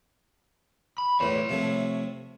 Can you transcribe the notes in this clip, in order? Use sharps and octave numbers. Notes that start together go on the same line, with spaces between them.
B5
E2 A2 C#5 C6
C3 F3 A3